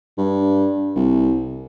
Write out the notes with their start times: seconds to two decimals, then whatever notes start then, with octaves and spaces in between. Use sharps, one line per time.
0.18 G2
0.96 C2